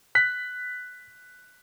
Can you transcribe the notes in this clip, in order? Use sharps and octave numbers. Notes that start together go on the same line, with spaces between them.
F#6 B6